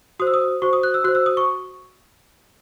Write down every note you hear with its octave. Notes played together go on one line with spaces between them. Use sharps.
F#4 C5 D#6
E6
D#6
F#4 C5 C#6
D#6
F#6
E6
F#4 C5 F#6
E6
D#6
C#6